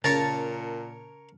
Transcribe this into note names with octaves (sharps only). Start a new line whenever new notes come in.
A#2 C#3 A#4 C#5 A5 C#6